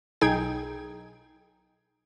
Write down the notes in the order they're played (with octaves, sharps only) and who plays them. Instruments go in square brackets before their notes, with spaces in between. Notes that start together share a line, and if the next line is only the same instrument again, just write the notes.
[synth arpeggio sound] B1 D#4 G#4 G5 G#6